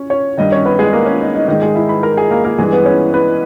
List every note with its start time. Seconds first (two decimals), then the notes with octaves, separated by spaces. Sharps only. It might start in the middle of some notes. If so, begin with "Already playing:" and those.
Already playing: C#4 C#5
0.10 C#4 C#5
0.37 G2 D#3 D#4 D#5
0.52 C#4 C#5
0.66 B3 B4
0.79 G#3 G#4
0.93 A#3 A#4
1.06 C#4
1.21 D#4
1.35 D#4
1.48 G#2 D#3 D#4
1.62 G#3 G#4
1.75 E4 E5
1.89 B4 B5
2.03 A#4 A#5
2.17 G#4 G#5
2.30 A#3 A#4
2.44 A#3 A#4
2.58 G2 E3 G#3 G#4
2.73 B3 B4
2.86 C#4 C#5
3.14 B3 B4